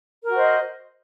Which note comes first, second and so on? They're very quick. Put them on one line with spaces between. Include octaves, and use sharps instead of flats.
A#4 F#4 C5 D#5